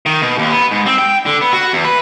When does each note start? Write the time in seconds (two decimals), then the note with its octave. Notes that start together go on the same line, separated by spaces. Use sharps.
0.06 D#3
0.22 B2
0.38 D#2
0.51 B3
0.71 G#2
0.86 C4
0.98 G5
1.26 D3
1.41 B3
1.53 F#4
1.73 E2
1.85 B4